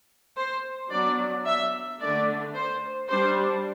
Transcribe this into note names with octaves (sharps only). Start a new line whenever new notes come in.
C5
F#3 B3 D4 D5
E5
D3 A3 D4 D5
C5
G3 D4 C5